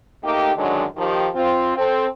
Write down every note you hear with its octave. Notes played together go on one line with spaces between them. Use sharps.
A3 A#3 D#4 G4
F#2 D3 D#3 F#3 G#3 D4
D#3 F3 G4
C4 F4
C4 A4